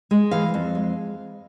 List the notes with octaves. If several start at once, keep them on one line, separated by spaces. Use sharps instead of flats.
G#3
E3 F5
F2
G#3